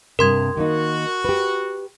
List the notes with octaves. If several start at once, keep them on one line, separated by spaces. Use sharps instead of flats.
G2 C3 A#4 C6 G#6
D#3 A#3 D#4 F#4
G4 B4